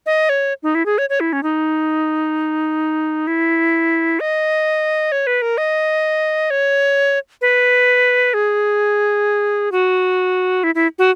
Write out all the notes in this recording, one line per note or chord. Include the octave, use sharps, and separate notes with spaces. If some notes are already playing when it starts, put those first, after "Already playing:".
D#5
C#5
D#4
E4
G#4
C#5
C#5
E4
C#4
D#4
E4
D#5
C#5
B4
A#4
D#5
C#5
B4
G#4
F#4
E4
E4
F#4